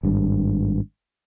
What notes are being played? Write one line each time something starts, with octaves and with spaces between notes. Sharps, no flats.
G#1 G2